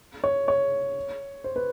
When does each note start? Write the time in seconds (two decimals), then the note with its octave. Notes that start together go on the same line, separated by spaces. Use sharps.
0.24 C#5
0.48 C#5
1.44 C5
1.56 B4